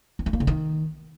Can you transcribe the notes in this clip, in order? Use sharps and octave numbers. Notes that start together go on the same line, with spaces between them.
B3
A3
A#3
D3
D#3